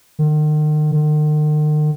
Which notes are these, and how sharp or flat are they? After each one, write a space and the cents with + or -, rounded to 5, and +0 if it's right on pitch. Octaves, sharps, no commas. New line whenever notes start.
D#3 -40
D#3 -45